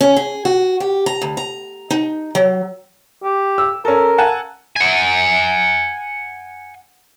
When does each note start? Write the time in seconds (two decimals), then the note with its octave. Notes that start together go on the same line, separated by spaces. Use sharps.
0.01 C#4
0.16 G#4
0.45 F#4
0.80 G4
1.06 A#5
1.22 D2
1.37 A#5
1.90 D#4
2.35 F#3
3.23 G4
3.58 E6
3.85 C#4 A4 A#4
4.18 F#5 G#5 A5
4.76 F#5 G#5